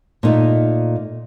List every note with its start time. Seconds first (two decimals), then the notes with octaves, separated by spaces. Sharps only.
0.23 A#2 A3 D#4